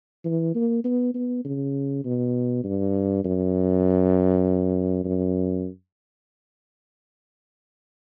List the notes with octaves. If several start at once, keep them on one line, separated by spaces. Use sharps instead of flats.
E3
A#3
B3
B3
C#3
B2
G2
F#2
F#2